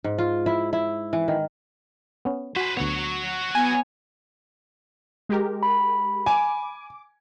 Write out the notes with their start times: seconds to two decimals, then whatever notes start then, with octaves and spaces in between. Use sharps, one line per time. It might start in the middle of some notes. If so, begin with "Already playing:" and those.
0.04 G#2
0.18 F4
0.46 E4
0.73 E4
1.13 E3
1.28 D#3
2.25 B3 C#4
2.56 F#4 B4 C5 G#5
2.77 D2 B3 F#4 C#5
3.55 B3 G#5
5.29 G#3 G4 A#4
5.63 B5
6.26 G#5 D6